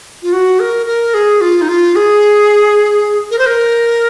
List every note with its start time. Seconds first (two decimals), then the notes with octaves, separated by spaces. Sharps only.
0.23 F4
0.33 F#4
0.60 A#4
0.86 A#4
1.14 G#4
1.41 F4
1.61 D#4
1.68 F4
1.96 G#4
3.31 A#4
3.39 C5
3.46 A#4